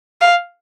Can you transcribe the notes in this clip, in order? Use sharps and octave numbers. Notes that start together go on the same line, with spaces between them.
F5